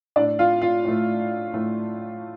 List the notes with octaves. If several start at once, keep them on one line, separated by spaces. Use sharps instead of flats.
A2 A3 D4 D5
F4 F5
F4 F5
A2 A3
A2 A3